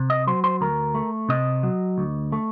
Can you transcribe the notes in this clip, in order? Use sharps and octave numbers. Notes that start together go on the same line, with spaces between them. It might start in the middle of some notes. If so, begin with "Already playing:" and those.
Already playing: C3
D#5
F#3 C5
C5
D2 A#4
A3
C3 D#5
F#3
D2
A3